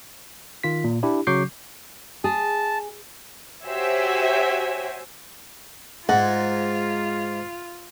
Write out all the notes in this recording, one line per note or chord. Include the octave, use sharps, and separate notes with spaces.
D#3 F4 B6
A#2
D4 E4 G4
C#3 F#3 C#6 D6 G6 C7
G#4 A5
F#4 G4 C5 C#5 E5 G#5
G#2 F4 F#5